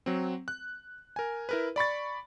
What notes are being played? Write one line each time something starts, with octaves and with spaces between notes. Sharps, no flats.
F#3 C4
F#6
A#4 G#5
E4 A#4 B4
D5 B5 C#6 A6